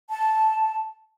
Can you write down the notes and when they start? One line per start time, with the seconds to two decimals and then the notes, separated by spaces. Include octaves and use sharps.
0.10 A5